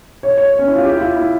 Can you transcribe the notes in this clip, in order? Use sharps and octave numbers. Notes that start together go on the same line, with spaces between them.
C#5
C#5
C#4
E4
F4
G4
E4
F4
E4